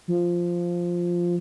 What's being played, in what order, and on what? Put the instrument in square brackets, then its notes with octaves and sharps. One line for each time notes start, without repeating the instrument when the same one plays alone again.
[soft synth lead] F3